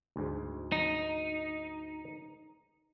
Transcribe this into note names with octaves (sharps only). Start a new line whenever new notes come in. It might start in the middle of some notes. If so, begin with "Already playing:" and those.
D2 G#2
D#4